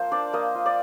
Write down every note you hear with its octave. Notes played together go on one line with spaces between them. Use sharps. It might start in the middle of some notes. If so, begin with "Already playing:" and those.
Already playing: F3 A#3 F4 C5
D4 D5
A#3 D#5
F4
D5